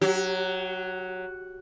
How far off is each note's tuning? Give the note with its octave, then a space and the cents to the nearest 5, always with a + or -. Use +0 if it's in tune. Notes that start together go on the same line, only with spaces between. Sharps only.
F#3 +0 G4 -40